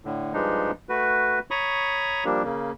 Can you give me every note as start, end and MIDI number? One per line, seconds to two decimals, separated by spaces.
0.05 0.33 45
0.05 0.33 50
0.33 0.71 43
0.33 0.71 53
0.33 0.71 56
0.33 0.71 62
0.33 0.71 63
0.89 1.39 57
0.89 1.39 66
0.89 1.39 71
1.51 2.24 73
1.51 2.24 82
1.51 2.24 83
1.51 2.24 85
1.51 2.24 87
2.25 2.43 53
2.25 2.43 55
2.25 2.43 58
2.25 2.43 62
2.44 2.72 49
2.44 2.72 58